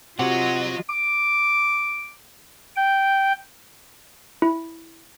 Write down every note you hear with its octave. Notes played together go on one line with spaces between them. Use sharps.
C3 F#3 F4 D#5 F#5
D6
G5
E4